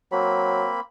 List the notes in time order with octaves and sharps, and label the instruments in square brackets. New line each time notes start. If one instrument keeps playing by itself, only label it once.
[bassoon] F#3 [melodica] A#3 C4 B5